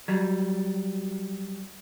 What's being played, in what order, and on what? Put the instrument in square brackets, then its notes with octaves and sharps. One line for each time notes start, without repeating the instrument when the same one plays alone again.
[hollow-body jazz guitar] F#3 G3